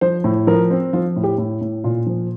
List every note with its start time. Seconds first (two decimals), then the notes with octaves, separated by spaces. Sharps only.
0.01 F3 C5
0.24 A2
0.47 F3 A#4
0.70 C4
0.93 F3 F4
1.16 A2
1.23 G4
1.38 A2
1.61 A2
1.84 A#2 F4
2.06 F3